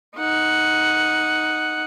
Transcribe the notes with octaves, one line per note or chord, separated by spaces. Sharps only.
D#4 F#5